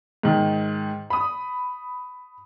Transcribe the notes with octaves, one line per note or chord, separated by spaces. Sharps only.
G#2 D#3
B5 D#6